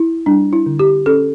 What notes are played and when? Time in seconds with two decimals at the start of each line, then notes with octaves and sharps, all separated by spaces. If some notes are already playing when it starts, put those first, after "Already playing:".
Already playing: E4
0.26 G3 D4
0.53 E4
0.66 D3
0.79 G4
1.06 C#4 A4